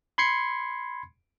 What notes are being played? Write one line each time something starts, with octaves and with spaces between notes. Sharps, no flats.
B5 C6 G#6 C7 C#7